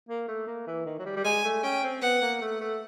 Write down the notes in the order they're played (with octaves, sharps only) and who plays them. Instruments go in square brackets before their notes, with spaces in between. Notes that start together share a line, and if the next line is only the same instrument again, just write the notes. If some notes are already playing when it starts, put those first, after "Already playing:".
[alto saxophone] A#3
A3
A#3
E3
D#3
F#3
G3
G3
[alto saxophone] G#3 [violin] G#5
[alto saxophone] A3
[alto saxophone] C#4 [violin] G5
[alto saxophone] C4
[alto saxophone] B3 [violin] F#5
[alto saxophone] A#3
A3
A3